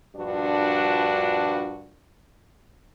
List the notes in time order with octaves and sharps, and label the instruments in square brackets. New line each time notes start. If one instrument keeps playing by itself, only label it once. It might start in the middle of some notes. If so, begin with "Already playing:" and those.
[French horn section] G2 A#2 F3 D4 F#4